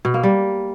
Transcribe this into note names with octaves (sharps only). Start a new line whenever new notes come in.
B2
A#3
G3